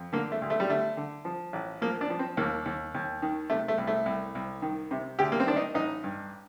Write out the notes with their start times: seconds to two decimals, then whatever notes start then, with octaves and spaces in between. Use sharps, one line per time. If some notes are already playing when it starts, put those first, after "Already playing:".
Already playing: F2
0.13 D3 A#3
0.32 A3
0.42 D2
0.50 A3
0.60 G3
0.69 D3 A3
0.97 D3
1.25 F3
1.53 A1
1.81 F3 A#3
2.01 D4
2.10 F3
2.19 C4
2.37 D#2 A#3
2.66 D#2
2.94 D#2
3.22 D#3
3.50 C3 A3
3.68 A3
3.78 C2
3.87 A3
4.06 C2
4.35 C2
4.62 D#3
4.91 C3
5.19 D2 G4
5.32 A#3
5.40 C4
5.46 D#3 D4
5.57 D#4
5.74 A1 D#4
6.04 G2